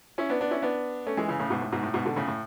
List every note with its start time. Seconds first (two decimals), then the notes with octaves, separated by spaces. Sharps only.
0.18 C#4 E4
0.30 B3 D4
0.41 B3 D4
0.51 C#4 E4
0.62 B3 D4
1.06 A3 C#4
1.17 E3 G#3
1.28 C#3 E3
1.39 A2 C#3
1.50 G#2 B2
1.61 A2
1.72 G#2 B2
1.83 A2
1.94 G#2 B2
2.05 B2 D3
2.16 A2 C#3
2.28 A2